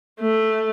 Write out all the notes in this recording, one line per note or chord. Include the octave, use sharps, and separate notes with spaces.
A3